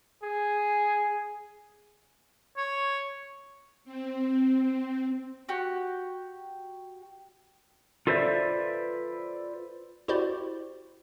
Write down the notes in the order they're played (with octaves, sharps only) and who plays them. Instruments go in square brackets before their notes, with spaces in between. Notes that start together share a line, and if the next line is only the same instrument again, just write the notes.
[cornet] G#4
[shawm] C#5
[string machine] C4
[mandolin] F#4 G4
[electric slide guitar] F4 A4 B4 C5 D5 E5
[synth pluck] E4 F#4 G4 C5 D5